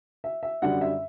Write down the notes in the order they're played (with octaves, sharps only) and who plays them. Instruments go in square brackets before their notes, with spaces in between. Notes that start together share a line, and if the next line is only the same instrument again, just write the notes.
[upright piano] E5
E5
F#2 D3 G3 F#5
E5